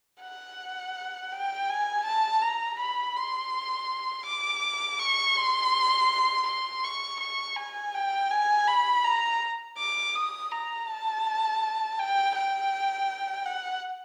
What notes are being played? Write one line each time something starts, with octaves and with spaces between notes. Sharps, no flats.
F#5
G5
G#5
A5
A#5
B5
C6
D6
C#6
C6
C6
C#6
C#6
G#5
G5
G#5
B5
A#5
D6
D#6
A#5
A5
G5
G5
F#5